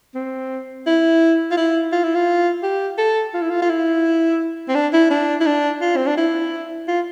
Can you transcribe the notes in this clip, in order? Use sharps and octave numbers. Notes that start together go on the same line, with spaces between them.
C4
E4
F4
E4
F4
E4
F4
G4
A4
F4
E4
F4
F4
E4
C4
D4
E4
D4
E4
D4
F4
C4
D4
E4
F4